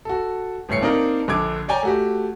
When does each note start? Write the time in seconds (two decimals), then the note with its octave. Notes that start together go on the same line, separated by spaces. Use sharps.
0.05 F#4 A4
0.69 G1 A2 C#5 C7 C#7
0.81 A#3 C4 D4 D#4 A#4
1.28 A#1 D3 D6 G#6 D7
1.68 C#5 D5 G5 G#5 A#5
1.83 A3 F#4 G4